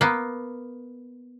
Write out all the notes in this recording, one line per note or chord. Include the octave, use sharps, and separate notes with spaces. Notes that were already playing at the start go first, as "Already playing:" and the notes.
A#3 B3